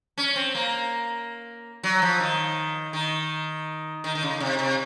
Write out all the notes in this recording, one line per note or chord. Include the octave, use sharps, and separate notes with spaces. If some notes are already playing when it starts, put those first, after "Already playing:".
C#4
C4
A#3
F#3
F3
D#3
D#3
D#3
D#3
C#3
C3
C3